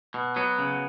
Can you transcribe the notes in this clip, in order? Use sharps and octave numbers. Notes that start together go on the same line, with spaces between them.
B2
F#3 B3
C#3